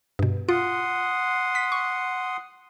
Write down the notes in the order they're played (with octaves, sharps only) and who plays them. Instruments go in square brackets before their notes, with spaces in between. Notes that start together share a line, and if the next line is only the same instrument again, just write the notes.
[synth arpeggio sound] G2 B2
[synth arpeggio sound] F4 [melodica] F#5 C6 D#6
[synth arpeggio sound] B6
C#6